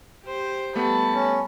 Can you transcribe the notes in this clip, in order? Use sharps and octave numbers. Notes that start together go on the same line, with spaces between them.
G4 C5
G3 A3 B3 A5 B5
C#4